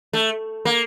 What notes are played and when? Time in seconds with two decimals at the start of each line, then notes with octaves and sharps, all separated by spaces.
0.13 A3
0.65 A#3